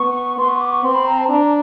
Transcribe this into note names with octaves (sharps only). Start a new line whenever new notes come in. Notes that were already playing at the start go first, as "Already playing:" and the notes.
Already playing: B3 C#6
B3 C6
C#6
D6
C#6
C4 C6
B5
A#5
A5
D4 A#5